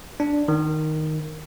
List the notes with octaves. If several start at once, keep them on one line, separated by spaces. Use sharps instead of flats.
D4
D#3